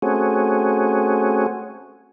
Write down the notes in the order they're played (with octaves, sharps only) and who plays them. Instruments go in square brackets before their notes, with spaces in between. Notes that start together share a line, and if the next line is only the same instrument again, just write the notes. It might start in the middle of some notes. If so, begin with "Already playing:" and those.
[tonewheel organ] A3 C4 C#4 F#4 G#4